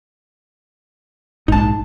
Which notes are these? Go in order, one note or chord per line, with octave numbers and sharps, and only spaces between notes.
A#1 G#2 D#4 A5